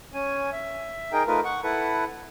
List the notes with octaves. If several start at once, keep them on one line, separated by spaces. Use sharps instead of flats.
C#4 G#5
E5
D#4 G#4 A#4 G5
A3 D#4 F4 A#4 B4
F#5 C#6
E4 A4 B4 F#5